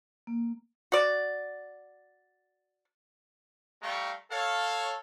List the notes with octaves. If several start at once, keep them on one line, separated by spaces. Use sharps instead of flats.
A#3
F#4 D5
G3 A3 F5 G5 A#5 C#6
A4 C#5 F5